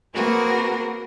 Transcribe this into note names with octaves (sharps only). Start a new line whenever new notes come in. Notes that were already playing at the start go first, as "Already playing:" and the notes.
A#3 C4 F#4 G#4 A#4 B4